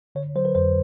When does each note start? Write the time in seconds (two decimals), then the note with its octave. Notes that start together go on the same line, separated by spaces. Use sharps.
0.15 D3 C#5
0.36 F#3 C5
0.45 B4
0.55 F2 C5